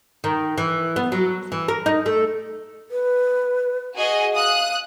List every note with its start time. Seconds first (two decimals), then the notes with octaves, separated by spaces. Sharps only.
0.24 D#3
0.58 E3
0.96 B3
1.12 F#3
1.52 E3
1.68 A#4
1.86 D#4
2.06 A3
2.91 B4
3.97 F#4 G#4 D#5
4.34 F5 D#6 F#6